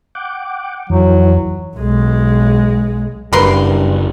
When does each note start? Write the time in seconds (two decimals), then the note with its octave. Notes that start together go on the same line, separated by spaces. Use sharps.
0.15 F#5 G5 D6
0.90 F2 E3 F#3
1.76 B1 G#3
3.33 F#1 G2 A#4 B4 C6